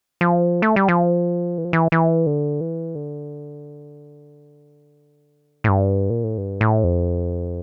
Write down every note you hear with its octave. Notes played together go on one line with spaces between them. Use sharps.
F3
A3
G3
F3
E3
F3
E3
E3
D3
E3
D3
A2
G2
A#2
A2
G2
A2
F2